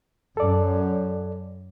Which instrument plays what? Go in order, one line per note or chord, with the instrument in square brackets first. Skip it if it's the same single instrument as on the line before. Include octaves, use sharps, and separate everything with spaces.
[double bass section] F#2 [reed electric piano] A4 D5